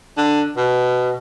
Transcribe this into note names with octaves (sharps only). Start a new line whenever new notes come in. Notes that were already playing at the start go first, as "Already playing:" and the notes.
D3
B2